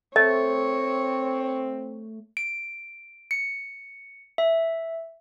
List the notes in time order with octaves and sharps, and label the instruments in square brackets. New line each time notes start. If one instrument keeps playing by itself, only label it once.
[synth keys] A3 [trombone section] C4 [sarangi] C#5 [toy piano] D#5
[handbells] D7
C#7
E5